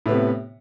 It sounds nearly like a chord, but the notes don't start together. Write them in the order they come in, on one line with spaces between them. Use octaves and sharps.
A2 B3 C3